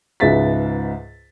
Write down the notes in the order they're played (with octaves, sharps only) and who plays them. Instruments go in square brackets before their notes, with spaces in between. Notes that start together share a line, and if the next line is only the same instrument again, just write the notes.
[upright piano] C#2 G#2 B4 E5 A6 B6